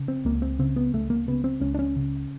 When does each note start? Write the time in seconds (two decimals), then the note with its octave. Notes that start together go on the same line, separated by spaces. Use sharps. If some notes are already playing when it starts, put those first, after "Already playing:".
Already playing: C#3
0.08 C4
0.25 C#2 A#3
0.42 C4
0.59 C#3 C4
0.76 B3
0.93 C#2 A3
1.10 A#3
1.27 C#3 B3
1.44 C4
1.61 C#2 C#4
1.74 D4
1.79 C#4
1.96 C#3